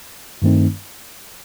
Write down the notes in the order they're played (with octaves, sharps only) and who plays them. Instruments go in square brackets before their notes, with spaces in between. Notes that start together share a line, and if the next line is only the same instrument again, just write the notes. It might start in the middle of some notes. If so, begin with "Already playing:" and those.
[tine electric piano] G2 D#3 A3 C4 D#4